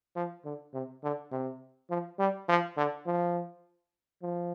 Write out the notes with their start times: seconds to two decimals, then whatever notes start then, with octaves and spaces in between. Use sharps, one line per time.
0.16 F3
0.45 D3
0.74 C3
1.03 D3
1.32 C3
1.90 F3
2.19 G3
2.49 F3
2.77 D3
3.06 F3
4.23 F3